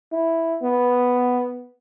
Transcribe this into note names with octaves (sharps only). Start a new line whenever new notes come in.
E4
B3